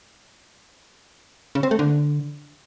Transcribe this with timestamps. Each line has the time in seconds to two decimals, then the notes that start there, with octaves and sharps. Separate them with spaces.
1.55 C#3
1.63 C4
1.71 A3
1.79 D3